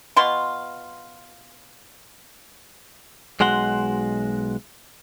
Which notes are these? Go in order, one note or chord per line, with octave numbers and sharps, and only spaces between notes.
B2 F4 C6
B1 G#3 F#4 F#5 C6